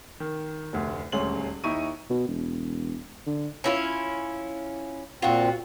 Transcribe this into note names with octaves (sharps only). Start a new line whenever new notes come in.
D#3
F1 D2
D#1 D2 G#3 C#4 F#7
D#2 D#4 E4 C#6 D#7
B2
E1
D3
C#4 E4 F4
A#2 C4 F4 F#4